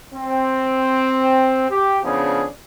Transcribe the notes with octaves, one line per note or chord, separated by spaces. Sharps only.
C4
G4
C#3 F3 B3 D4 G#4